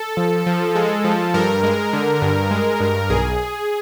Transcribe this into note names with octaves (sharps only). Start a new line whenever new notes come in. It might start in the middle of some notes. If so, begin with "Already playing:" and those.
Already playing: A4
F3
F3
G#3
F3
G2 A#4
G#3
D3
G2
G#3
G2
B1 G#4